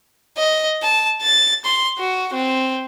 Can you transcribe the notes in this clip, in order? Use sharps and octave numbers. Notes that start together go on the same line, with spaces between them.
D#5
A5
A6
C6
F#4
C4